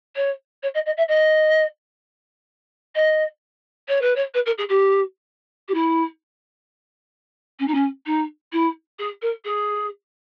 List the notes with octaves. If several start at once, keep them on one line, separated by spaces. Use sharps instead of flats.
C#5
C#5
D#5
D#5
E5
D#5
D#5
C#5
B4
C#5
B4
A#4
G#4
G4
G4
E4
C#4
D#4
C#4
D#4
E4
G#4
A#4
G#4